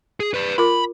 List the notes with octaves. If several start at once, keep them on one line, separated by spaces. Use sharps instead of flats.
G#4
B4 D5
F4 A#4 B5 D6